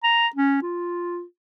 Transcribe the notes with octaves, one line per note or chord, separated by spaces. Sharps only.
A#5
C#4
F4